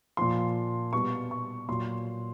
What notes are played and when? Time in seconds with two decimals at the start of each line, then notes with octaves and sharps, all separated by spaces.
0.17 A#2 F3 C6
0.93 B2 G3 C#6
1.31 C#6
1.68 A#2 F#3 C6